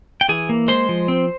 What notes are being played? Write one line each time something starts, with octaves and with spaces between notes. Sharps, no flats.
G5
E3 G#4 G#5
A#3
G#3 C5 C6
F3
C4